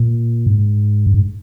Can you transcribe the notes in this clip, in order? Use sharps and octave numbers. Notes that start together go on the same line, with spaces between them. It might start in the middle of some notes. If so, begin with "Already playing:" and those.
Already playing: A#2
G#2
G2
G#2